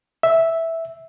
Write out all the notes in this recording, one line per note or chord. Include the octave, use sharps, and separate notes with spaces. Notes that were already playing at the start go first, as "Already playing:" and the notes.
E5